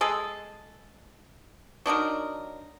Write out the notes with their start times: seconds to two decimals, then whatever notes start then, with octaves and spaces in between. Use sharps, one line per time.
0.01 G#3 G#4 A4
1.86 F#3 D4 D#4 A#4